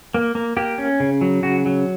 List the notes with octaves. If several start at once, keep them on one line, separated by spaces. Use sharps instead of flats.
A#3
A#3
A#3 G4
C#4
C#3
F#3
C#3 F#4
F#3